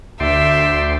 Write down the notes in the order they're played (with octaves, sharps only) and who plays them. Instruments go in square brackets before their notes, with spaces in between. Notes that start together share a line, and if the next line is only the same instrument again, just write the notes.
[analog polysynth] D2 [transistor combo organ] D5 G5 C6 [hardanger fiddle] E5